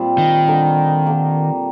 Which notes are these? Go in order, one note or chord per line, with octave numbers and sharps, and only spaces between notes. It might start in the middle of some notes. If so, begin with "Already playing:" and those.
Already playing: A#2 G3 C4 F4
D#3
D3 G3 A#3
D3 G3 A#3